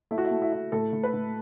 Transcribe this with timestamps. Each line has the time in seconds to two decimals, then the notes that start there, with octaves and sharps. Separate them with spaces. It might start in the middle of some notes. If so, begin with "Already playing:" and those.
0.11 A3 E4
0.18 F#4
0.25 E4
0.31 A3
0.42 E4
0.52 E4
0.72 A2 A4
0.93 A2
1.03 B4
1.13 A2